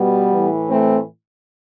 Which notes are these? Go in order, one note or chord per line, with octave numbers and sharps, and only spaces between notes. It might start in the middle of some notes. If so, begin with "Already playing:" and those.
Already playing: B2 G3 B3
A2 E3
A3 C4